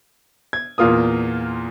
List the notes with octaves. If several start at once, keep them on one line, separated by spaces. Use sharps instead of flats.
G#6
E2 A#2 F4 A#4 D#6